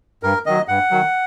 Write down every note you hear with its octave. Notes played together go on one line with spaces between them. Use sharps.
G2 A#4
D#3 F#3 D#5
G2 F#5
D#3 F#3